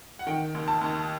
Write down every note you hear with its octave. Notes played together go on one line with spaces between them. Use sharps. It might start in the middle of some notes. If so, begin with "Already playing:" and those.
F#5
D#3 G5
D#2
A5
D#2